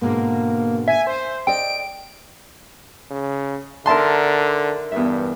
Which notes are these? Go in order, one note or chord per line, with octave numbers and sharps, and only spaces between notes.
G#2 B2 D3 A#3
E5 G#5
C5
A4 D5 D#5 G5 D7
C#3
D3 D#4 A#4 E5 A5 C6
E2 G2 E5